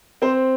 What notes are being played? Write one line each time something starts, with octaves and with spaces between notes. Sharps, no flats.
C4 C5